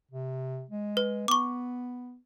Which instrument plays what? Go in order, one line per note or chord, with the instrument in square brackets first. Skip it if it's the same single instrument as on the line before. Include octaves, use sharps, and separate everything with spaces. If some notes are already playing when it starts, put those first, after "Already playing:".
[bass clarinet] C3
G#3
[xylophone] B4
[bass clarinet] B3 [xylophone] C#6 D6